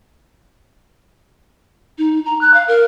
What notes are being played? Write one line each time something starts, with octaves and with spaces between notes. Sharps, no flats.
D#4
A#5
F#6
F5
A#4